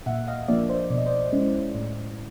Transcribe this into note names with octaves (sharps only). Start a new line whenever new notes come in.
A#2 E5 F#5
D#5 F5
F3 A#3 D4 D5 E5
C5 D5
B2 D5
D#5
C5 D5
G#3 C#4 E4
A2